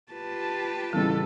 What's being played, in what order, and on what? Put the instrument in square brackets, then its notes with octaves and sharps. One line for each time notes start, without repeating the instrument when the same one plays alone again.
[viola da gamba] F4 G4 B4 [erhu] A5
[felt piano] A1 C#3 E3 [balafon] G3 [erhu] A4